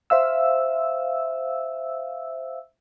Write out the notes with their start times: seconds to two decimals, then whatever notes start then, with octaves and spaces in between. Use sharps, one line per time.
0.10 C5 E5 F5 E6